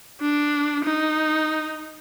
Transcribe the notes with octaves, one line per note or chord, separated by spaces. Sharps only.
D4
D#4